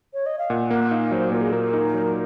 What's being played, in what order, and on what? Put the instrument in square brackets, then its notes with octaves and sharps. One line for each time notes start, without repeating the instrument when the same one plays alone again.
[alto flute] C#5
D#5
F5
[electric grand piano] A#2 [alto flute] F#5
[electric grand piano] A#3 [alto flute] F#5
[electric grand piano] D#4 [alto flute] F5
[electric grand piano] F#3 [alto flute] C5
[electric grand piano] A#2 [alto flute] A#4
[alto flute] G#4
[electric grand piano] A#3 [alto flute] A#4
[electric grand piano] D#4
F#3